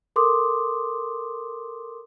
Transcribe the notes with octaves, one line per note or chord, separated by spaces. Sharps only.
A4 A#4 C6 D6 D#6